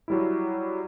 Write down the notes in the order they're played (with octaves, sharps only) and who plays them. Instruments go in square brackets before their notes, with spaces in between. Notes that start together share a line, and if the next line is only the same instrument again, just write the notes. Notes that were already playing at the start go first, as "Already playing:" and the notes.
[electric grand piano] F#3 G3 E4